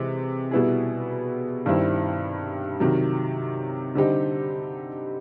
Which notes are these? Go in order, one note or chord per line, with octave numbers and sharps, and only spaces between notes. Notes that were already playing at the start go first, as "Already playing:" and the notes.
Already playing: C3 E3 G#3 C4
B2 G3 B3 E4 G#4
G2 D#3 G3 C4 E4
C3 D#3 F#3
D3 G3 C4 D#4 G4